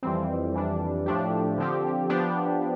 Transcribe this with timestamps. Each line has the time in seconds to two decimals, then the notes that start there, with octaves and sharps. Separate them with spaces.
0.03 F2 E3 G3 C4
0.54 F2 E3 G3 D4
1.06 A2 F3 A3 D4 G4
1.57 D3 F3 C4 G4
2.09 F3 B3 D4 G4